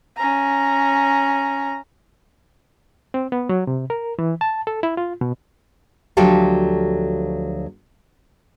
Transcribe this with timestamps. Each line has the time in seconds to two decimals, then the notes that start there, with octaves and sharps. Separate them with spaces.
0.17 C#4 A#5
3.14 C4
3.32 B3
3.49 F#3
3.67 C3
3.90 A#4
4.19 E3
4.41 A5
4.67 A4
4.83 E4
4.97 F4
5.21 B2
6.17 D2 F3 F#3 G4 A4 F5